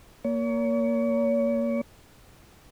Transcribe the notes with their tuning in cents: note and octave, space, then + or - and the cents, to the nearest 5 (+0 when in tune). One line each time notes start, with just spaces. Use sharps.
A#3 +0 C#5 +35